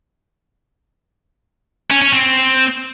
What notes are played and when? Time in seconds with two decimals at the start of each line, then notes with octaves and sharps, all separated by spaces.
1.91 C#4
2.02 C#4
2.13 C4